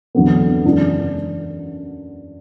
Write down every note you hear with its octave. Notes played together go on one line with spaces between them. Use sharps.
E2 D3 F#3 B3
F#2 C#3 E3 G#3 D4